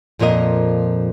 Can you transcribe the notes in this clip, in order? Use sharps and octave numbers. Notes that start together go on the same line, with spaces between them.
F2 A#2 F3 A#4 D#5